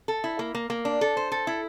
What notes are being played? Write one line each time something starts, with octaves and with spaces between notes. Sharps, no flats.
A4
E4
A#3
A#3
A#3
D4
A4
C5
A4
E4